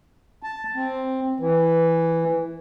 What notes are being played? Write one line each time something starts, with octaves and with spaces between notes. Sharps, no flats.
A5
C4
E3